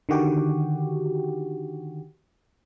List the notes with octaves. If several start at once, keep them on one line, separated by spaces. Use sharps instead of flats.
D3 D#3 F#4 G4